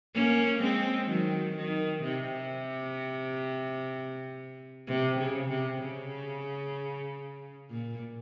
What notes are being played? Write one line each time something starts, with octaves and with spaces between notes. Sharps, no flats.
A#3 C#4
G#3 C4
D#3 F#3
D#3
C3
C3
C#3
C3
C#3
A#2